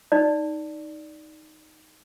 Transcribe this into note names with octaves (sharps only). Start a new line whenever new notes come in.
D#4 D5